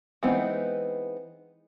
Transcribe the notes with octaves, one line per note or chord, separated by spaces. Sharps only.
E3 G#3 B3 C4 D#4